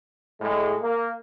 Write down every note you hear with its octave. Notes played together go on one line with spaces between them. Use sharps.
A2 G#3
A#3